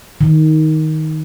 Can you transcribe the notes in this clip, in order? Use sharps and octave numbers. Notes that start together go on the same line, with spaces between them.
D#3